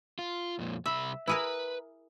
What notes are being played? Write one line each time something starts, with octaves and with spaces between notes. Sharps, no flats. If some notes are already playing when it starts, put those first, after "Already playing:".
F4
F2 A#2
C2 E5 B5
E4 G#4 A#4 B4